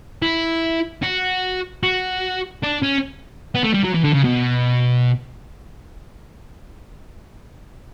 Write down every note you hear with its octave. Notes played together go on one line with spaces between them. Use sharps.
E4
F#4
F#4
D4
C#4
B3
A3
G3
F#3
E3
D3
C#3
B2